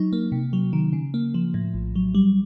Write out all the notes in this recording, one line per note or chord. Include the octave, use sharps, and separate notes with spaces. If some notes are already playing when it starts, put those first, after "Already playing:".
Already playing: F#3 D#4
A#3
C3
F#3
D#3
C#3
A#3
F3
A2
A#1
F#3
G3